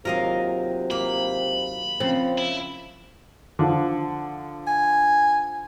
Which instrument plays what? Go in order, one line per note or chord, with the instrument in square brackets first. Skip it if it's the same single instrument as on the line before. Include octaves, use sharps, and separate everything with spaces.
[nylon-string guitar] D#2 F#3 F4 [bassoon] C3 [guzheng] A#4 D#5 F5
[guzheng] A#3 [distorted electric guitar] B5
[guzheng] C#3 F3 [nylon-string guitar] C4
[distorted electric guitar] E4
[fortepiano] D3 F3
[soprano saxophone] G#5